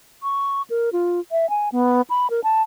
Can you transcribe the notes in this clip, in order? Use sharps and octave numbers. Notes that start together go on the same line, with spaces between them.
C#6
A#4
F4
E5
G#5
B3
B5
A#4
A5